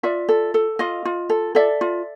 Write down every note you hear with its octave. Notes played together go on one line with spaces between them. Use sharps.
F4 D5 E5
A4
A4
F4 D#5 F5
F4
A4
A4 D5 E5
F4